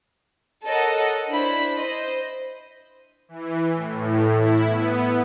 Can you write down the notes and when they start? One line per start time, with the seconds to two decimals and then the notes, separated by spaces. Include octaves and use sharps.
0.64 A4 A#4 C#5 D#5 F#5
1.30 D4 E4 C5 B5
1.77 C5 D#5
3.29 E3
3.74 A2
4.32 E4
4.67 B3